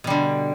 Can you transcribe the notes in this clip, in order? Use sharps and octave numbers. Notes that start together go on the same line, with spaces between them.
B2 D3 G3